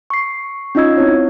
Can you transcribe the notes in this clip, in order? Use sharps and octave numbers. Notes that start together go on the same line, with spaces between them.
C#6 C7
C#4 D#4 F4 D#5 E6 G#6
C4 E4 C#5